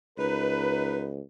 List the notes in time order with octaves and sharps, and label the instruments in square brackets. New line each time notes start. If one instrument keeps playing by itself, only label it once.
[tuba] C#2 [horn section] D#4 A#4 B4